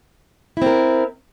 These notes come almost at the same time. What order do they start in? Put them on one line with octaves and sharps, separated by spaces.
E4 C4 A#4